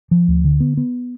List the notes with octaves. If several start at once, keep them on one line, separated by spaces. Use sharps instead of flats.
F3
D2
D3
B3
B3